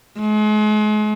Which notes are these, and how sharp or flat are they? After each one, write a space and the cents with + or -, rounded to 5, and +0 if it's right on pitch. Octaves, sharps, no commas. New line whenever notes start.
G#3 +40